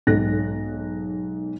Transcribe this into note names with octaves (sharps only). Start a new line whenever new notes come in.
B1 G#2 A4 F#6 A#6